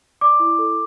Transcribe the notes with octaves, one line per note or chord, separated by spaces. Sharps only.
D5 D6
E4
A4